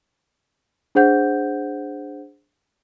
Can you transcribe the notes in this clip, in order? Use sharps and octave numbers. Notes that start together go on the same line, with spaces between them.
D4 G#4 C5 F#5 G6